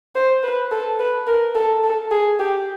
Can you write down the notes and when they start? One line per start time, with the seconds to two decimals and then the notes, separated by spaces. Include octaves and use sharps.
0.15 C5
0.43 B4
0.71 A4
0.99 B4
1.27 A#4
1.55 A4
1.84 A4
2.11 G#4
2.39 G4